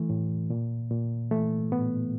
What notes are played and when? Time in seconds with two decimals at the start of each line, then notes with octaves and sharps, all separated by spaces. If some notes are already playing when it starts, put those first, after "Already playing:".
Already playing: E3 A3
0.10 A2
0.50 A#2
0.91 A#2
1.31 E3 A3
1.72 A2 B3